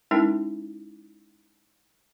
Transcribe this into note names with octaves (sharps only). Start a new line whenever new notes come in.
G#3 C#4 D#4 E4 A#4 G5